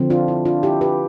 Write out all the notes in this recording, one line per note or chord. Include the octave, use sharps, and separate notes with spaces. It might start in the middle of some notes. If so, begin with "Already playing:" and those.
Already playing: D3 F3 C4
D4 F4
E4
D4 F4
E4 G4
G4 B4